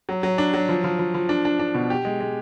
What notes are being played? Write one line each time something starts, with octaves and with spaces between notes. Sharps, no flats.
F#3
F#3
D4
F#3
F3
F3
F3
F3
D4
D4
D4
B2
G4
G#3
G#3